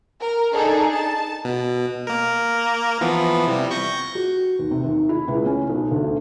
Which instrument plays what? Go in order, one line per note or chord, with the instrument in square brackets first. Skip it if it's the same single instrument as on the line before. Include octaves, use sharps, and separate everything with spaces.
[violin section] A#4
D4 D#4 G#4 A4
A5
[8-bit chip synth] B2
A#3 A#4
E3 F3 B3
C3 G3
C#6 G6 A#6
[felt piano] F#4
D#2
C3
D#2
E4
C#2
C#4
B1
D2